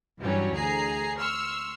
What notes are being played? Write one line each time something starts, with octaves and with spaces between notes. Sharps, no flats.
G2 E3 F#3 G3 C#4
D2 G#4 A#5 C7
C6 C#6 E6 F6